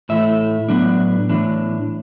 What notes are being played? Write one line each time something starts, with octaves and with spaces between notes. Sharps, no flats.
A2 E3 A3 E4 E5
A2 F#3 B3 D4
A2 E3 D4